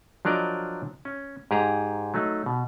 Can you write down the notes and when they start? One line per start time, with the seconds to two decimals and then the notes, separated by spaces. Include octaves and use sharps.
0.25 F3 F#3 D4 A#4 D5 D#5
1.05 C#4
1.51 G#2 G4 G#4 A#5
2.14 F#3 A3 D#4
2.46 B2